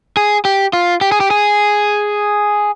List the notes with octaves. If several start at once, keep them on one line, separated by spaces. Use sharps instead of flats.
G#4
G4
F4
G4
G#4
G4
G#4